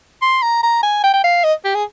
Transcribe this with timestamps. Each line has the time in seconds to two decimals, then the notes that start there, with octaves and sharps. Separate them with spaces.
0.22 C6
0.42 A#5
0.63 A#5
0.83 G#5
1.04 G5
1.14 G5
1.24 F5
1.44 D#5
1.65 G4
1.75 G#4